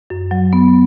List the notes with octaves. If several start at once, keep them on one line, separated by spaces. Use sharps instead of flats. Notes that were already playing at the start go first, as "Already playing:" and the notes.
F#2
F#3
B3